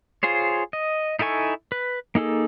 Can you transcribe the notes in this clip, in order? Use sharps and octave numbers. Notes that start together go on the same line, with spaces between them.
F4 G#4 C5 C#5
D#5
D#4 E4 A4 G#5 C#6
B4
A#3 D#4 G#4 A4